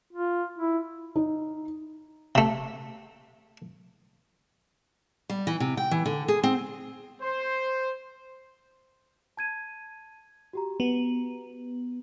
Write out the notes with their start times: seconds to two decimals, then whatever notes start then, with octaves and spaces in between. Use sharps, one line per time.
0.13 F4
0.59 E4
1.16 D#4
2.35 C3 A3
5.30 G3
5.47 E3
5.60 C3
5.77 G5
5.91 E3
6.06 D3
6.28 G#4
6.43 C4
7.21 C5
9.37 A5 G#6 D#7
10.53 F#4 G4 A#5
10.80 B3